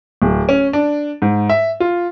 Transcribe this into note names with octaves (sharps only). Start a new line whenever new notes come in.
D1
C#4
D4
G#2
E5
F4